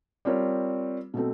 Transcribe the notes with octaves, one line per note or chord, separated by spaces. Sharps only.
G3 C4 F4 A#4 C#5
B2 F#3 A3 C4